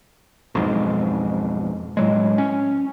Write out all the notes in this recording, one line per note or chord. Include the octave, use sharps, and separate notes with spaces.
B1 F2 G#2
A2 F#3 G#3
C#4